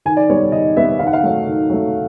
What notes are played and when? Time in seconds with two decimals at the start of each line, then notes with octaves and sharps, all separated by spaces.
0.05 D#3 G#5
0.17 D5
0.29 G3 B3 C#5
0.52 D#3 D#5
0.76 G3 B3 E5
0.99 D#3 F5
1.07 F#5
1.13 F5
1.23 F#3 A3
1.47 D#3
1.70 F#3 A3